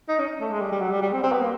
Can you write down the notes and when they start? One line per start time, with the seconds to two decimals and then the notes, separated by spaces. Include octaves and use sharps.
0.08 D#4
0.19 C#4
0.41 A3
0.51 G#3
0.61 G3
0.72 G3
0.81 F#3
0.91 G3
1.02 G3
1.13 C4
1.23 C4
1.32 B3
1.41 A#3